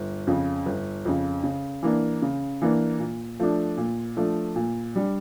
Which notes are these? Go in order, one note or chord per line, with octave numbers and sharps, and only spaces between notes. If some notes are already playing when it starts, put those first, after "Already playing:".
Already playing: G1
F2 C#3
G1
F2 C#3
C#3
E3 A#3 D4
C#3
E3 A#3 D4
A#2
F3 A3 D4
A#2
F3 A3 D4
A#2
G3 D4